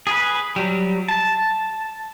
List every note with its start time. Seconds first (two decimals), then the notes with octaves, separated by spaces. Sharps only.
0.07 G#4 B4
0.56 F#3 G3
1.08 A5